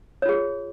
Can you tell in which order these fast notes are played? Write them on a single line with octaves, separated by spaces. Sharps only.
C#5 F4 G#4